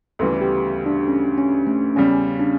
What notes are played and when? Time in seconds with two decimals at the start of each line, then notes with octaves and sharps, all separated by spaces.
0.19 D2 C#3 E3 G3 B3 A4
0.41 G4
0.86 D4
1.08 C#4
1.38 C#4
1.67 A3
1.96 E2 C#3 G3 C#4
2.40 D4